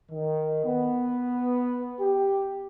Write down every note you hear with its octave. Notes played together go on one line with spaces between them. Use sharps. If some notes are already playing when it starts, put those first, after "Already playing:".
D#3
B3
G4